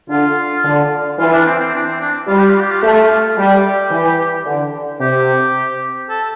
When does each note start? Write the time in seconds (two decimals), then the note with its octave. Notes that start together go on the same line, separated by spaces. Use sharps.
0.09 D3 F4
0.64 D3
1.19 E3 F4
1.33 D4
1.46 C4
1.60 C4
1.74 D4
1.87 C4
2.01 D4
2.27 G3 F4
2.39 G4
2.50 F4
2.60 G4
2.71 F4
2.82 A3 G4
2.92 F4
3.38 G3 G4
3.91 E3
4.46 D3
5.00 C3 G4
6.10 A4